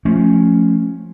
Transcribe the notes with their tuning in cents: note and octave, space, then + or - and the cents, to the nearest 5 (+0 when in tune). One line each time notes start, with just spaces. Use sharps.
F3 +0 A3 +0 C#4 +0